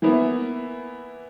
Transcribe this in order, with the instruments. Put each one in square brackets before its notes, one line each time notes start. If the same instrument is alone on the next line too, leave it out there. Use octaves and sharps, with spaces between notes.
[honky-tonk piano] E3 A#3 B3 E4